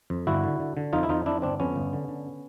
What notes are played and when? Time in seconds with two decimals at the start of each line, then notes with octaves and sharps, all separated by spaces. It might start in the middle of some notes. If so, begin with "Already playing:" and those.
0.10 F2
0.27 G1 E4 F#4
0.44 D3
0.60 D3
0.77 D3
0.93 F2 D#4 F4
1.03 E4
1.09 F2 D#4 F4
1.26 F2 D4 E4
1.42 G1 C4 D4
1.60 F2 B3 C#4
1.76 G1
1.93 D3
2.08 D3